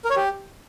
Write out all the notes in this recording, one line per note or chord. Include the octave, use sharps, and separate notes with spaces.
A#4
C#5
G4